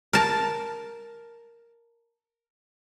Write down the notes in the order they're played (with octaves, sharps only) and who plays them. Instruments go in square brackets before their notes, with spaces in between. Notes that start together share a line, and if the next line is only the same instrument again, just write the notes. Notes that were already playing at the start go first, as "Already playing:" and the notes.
[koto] A#4 A5